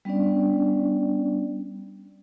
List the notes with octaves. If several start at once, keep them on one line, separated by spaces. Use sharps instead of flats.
G3 B3 C#4 D4 D5